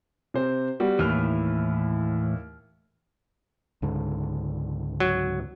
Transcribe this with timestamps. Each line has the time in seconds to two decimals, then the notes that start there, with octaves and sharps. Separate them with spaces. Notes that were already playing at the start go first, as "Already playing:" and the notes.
0.34 C3 C5
0.80 G3 B3 F#4
0.99 D#2 A2 E3 F6
3.82 C#2 G#2 D3
5.00 F#3